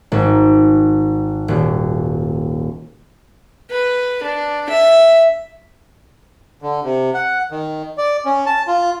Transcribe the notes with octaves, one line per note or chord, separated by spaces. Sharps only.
G#1
D#1
B4
D4
E5
D3
C3
F#5
D#3
D5
C#4
A5
F4